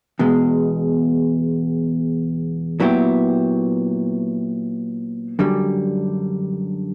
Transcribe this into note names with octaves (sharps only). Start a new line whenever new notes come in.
E2 B2 G#3
A#2 F#3 B3 E4 G4
F#2 D3 G3